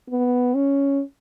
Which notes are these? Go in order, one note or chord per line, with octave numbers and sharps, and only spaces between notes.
B3
C#4